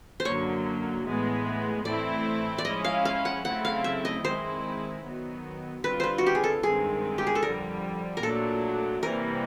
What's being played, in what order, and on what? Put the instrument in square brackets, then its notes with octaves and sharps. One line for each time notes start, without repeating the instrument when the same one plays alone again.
[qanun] C5
[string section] F#2 D3 F#3 A#3 [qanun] C#5
[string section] A2 E3 G#3 B3
[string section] A2 E3 A3 C4 E4 [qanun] D5
[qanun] D5
[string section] F3 G#3 C#4 E4 [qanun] D#5
[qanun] F5
F5
F#5
[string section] C#3 F#3 A3 C4 E4 [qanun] F#5
[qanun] F5
E5
D#5
[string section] D#3 G#3 C4 E4 [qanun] C5
[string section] D#3 F#3 B3
[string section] D3 G3 C4 F4 [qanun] B4
[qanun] B4 C5
F#4
G4
G#4
A4
[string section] G2 D#3 G#3 C4 [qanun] G#4
[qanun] G4
G#4
A4
[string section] F2 D3 G3 [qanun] A#4
[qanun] A#4
[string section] A#2 F#3 A3 D4 [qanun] A4
[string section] C3 E3 G3 A#3 [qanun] A#4